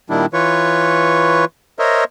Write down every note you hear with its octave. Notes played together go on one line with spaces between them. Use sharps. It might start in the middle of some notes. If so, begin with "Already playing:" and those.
A#2 D#3 G3 D4 E4
E3 F4 B4 C#5 C#6
A#4 C5 C#5 D#5 E5